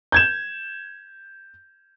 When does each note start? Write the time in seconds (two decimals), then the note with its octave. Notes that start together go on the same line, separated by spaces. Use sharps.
0.12 G6 G#6 E7